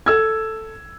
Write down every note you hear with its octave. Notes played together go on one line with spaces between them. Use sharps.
A4 E6 G#6